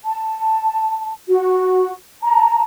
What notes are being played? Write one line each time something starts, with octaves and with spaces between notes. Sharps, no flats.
A5
F#4
A5 A#5